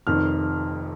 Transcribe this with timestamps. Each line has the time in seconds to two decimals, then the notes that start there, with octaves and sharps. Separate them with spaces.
0.07 F1 F2 D#3 F6